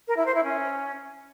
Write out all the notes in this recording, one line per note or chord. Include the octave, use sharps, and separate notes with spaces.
A#4
E4
C5
E4
C#4